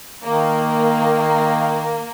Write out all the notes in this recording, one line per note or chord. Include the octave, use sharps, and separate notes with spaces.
D#3 A#3